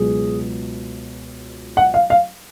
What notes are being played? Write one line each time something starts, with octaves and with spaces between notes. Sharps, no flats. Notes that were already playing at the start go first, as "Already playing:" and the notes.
Already playing: C#2 B2 F#3 G#4
F#5
F5
F5